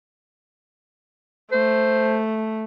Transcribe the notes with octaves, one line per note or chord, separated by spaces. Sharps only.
A3 C5